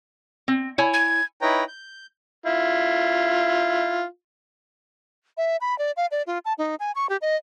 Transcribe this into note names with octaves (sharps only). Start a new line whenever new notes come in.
C4
E4 C#5 G#5
G#6
D#4 E4 B4 C#5 G5 A#5
G6
E4 F4
E5
B5
D5
F5
D5
F4
A5
D#4
G#5
C#6
G4
D#5